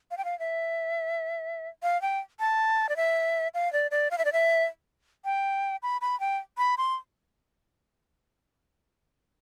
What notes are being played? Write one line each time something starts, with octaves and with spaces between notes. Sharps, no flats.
F5
G5
F5
E5
F5
G5
A5
D5
E5
F5
D5
D5
F5
E5
D5
E5
G5
B5
B5
G5
B5
C6